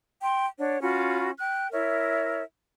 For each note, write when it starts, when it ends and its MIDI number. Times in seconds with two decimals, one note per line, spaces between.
0.22 0.47 79
0.22 0.47 84
0.59 0.79 62
0.59 0.79 73
0.59 0.79 78
0.82 1.30 61
0.82 1.30 65
0.82 1.30 66
0.82 1.30 83
1.38 1.68 79
1.38 1.68 90
1.72 2.42 64
1.72 2.42 70
1.72 2.42 73
1.72 2.42 76